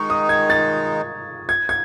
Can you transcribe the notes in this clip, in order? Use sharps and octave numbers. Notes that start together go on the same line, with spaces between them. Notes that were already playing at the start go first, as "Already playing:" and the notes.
Already playing: D#3 G#3 D#4 C#6
D#6
G#6
A6
G#6
G#6